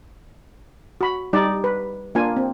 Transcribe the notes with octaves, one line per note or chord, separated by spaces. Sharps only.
F#4 B5
G3 D#4 D5
B4
A#3 D4 F4 G#5
C4